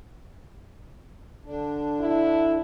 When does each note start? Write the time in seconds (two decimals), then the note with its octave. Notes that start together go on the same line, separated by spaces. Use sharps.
1.45 D3 D4
2.00 E4